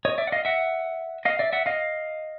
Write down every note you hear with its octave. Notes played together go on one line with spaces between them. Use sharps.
C#5 D#5
D5 E5
F#5
D#5 F5
E5 F#5
D#5 F5
D5 E5
E5 F#5
D#5 F5